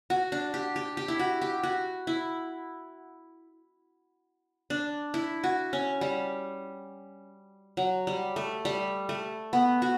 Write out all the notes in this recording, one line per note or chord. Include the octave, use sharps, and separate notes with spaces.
F#4
D4
G4
G4
G4
E4
F#4
G4
F#4
E4
D4
E4
F#4
C#4
G3
F#3
G3
A3
G3
A3
B3
F#4